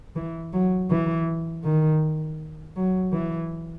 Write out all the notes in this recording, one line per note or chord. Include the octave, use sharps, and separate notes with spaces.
E3
F#3
E3
D#3
F#3
E3